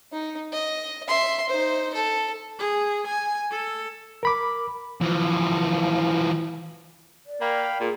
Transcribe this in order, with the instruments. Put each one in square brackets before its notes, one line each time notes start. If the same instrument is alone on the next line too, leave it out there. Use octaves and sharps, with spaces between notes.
[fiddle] D#4
D#5
E5 C6
D#4 C5
A4
[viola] G#4
G#5
A4
[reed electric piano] A#4 B5 D6
[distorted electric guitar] E3 F3
[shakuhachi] D5
[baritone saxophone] A#3 [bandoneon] F5 G5 B5
[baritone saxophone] A#2 [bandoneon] A#3 [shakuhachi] G#4